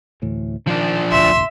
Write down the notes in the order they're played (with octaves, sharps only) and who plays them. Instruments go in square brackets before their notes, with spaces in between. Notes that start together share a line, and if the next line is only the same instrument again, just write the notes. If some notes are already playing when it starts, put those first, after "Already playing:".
[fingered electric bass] D2 A2 E3
[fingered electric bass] D#3 [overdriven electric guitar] F3 D4
[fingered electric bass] E1 A1 D2 [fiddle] E5 [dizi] C6